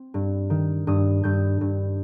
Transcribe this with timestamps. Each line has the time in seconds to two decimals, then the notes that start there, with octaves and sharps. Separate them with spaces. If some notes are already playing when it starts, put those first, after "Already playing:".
Already playing: C4
0.14 G2
0.50 D#3
0.87 G2 D#6
1.23 G2 G6
1.61 G2